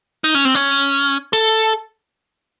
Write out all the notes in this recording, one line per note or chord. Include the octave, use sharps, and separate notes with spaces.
D#4
C#4
C4
C#4
A4